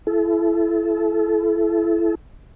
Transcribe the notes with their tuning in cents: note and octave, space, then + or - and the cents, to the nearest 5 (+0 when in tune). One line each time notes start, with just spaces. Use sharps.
E4 +25 A4 -30